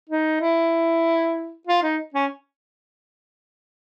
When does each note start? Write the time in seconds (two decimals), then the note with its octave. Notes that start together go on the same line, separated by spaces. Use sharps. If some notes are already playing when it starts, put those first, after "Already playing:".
0.09 D#4
0.41 E4
1.67 F4
1.83 D#4
2.14 C#4